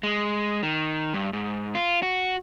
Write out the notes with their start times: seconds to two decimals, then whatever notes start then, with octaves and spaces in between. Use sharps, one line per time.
0.03 G#3
0.63 D#3
1.14 G2
1.33 G#2
1.75 F4
2.03 F#4